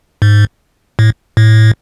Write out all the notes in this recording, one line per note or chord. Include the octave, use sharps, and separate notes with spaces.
G#2
A2
A2